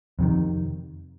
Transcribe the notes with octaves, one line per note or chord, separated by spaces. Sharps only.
F2 C3 D#3